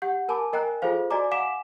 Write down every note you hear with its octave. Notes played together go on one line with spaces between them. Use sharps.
G4 F#5 G6
A#4 G#5 A5 B5 D6
A#4 D#5 G5 G#5 A#5 F#6
F4 G#4 A4 C5 F5
F#4 D5 D#5 G#5 A#5 D6
F5 F#5 G#5 D6 B6 E7